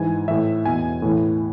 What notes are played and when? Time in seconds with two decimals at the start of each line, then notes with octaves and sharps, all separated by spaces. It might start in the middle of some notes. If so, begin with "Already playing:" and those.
Already playing: G#2 E3 G#5
0.28 A2 E3 E5
0.65 E2 B2 G#5
1.02 A2 E3